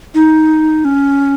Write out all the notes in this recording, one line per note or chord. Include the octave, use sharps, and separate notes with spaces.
D#4
C#4